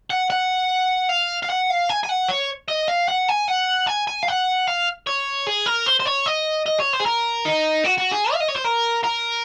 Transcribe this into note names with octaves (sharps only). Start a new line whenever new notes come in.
F#5
F#5
F5
F5
F#5
F5
G#5
G#5
F#5
C#5
D#5
F5
F#5
G#5
F#5
G#5
G#5
F5
F#5
F5
C#5
G#4
A#4
C5
C5
C#5
D#5
D#5
C#5
C5
G#4
A#4
D#4
F#4
F#4
G#4
F5
D#5
C#5
C5
A#4
A#4